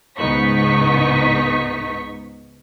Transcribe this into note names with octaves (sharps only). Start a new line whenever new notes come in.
C#2 G#2 B3 D#4 C#6 B6